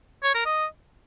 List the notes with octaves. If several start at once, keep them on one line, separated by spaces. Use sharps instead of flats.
C#5
A#4
D#5